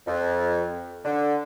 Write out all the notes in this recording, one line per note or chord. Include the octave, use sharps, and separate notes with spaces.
F2
D3